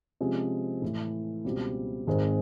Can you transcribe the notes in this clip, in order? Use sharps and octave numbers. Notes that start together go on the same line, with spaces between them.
C3 F3 G#3 C#4
A2 E3 A3
C#2 B2 G3 C4
G#1 G#2 D#3 G#3 C4